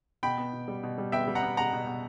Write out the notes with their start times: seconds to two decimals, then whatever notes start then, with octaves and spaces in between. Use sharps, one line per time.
0.23 B2 G5 B5
0.38 B3
0.53 B2
0.68 G3
0.84 B2
0.98 G3
1.12 B3 E5 G5
1.28 G3
1.35 F#5 A#5
1.43 B3
1.57 B2 F#5 A#5
1.73 B2
1.87 B2